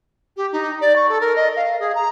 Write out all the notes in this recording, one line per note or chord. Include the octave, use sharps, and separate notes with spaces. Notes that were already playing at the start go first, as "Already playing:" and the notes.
G4
D#4
D5
C#6
A4
A#4
D#5
F5
G#4
A#5